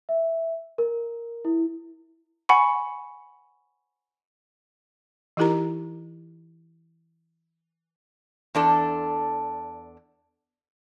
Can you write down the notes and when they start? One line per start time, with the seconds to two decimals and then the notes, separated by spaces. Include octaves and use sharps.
0.09 E5
0.78 A#4
1.45 E4
2.49 F#5 G#5 B5 C#6
5.37 E3 D#4 E4 G4 A#4 A#5
8.55 E2 D4 A4